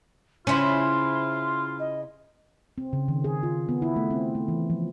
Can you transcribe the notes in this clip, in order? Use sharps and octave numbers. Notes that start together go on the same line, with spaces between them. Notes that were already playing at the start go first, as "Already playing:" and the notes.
C#3 C#4 E4 F4 C5 C6
D#5
C4
C#3
D#3
G#4
F4
B3
E4
A3
C4
A3
E3
F3